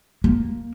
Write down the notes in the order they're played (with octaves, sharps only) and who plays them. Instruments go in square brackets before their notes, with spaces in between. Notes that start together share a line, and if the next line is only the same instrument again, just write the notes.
[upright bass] A#3